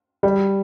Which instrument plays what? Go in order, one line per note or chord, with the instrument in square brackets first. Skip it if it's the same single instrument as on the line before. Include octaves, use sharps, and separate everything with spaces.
[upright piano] G3